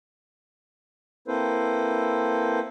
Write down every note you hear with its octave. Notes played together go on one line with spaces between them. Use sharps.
A#3 C4 E4 A4 B4 C5